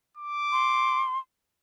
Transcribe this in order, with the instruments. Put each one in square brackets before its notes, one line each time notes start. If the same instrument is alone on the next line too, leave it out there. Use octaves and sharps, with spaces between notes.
[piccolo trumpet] D6
[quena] C6